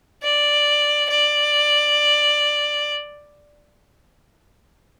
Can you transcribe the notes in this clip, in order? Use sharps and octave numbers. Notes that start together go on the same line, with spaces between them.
D5
D5